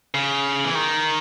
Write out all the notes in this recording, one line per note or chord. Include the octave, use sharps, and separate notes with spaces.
C#3
E3
D#3